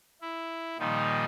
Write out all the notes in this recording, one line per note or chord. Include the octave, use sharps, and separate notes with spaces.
E4
A#2 D#3 F3 G3 D#4